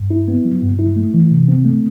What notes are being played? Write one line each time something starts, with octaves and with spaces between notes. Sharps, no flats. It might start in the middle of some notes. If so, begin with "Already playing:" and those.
Already playing: G2
E4
B3
F#3
G2
E4
A3
E3
C3
C4
A3